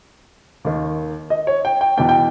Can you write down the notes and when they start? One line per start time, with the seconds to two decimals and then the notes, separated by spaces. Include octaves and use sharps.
0.65 D#2 D#3
1.30 D#5
1.47 C#5
1.65 G5
1.81 G5
1.97 E2 B2 G5
2.09 G5